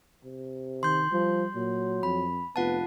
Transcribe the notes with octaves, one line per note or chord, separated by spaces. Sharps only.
C3
D#3 C6 G6
F3 G3
A#2 F#3
F2 B5
F1 B3 F4 F#5 A5